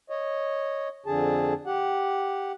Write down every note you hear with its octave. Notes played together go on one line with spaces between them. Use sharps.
C#5 D#5
F2 D3 G#4 A5
G4 F#5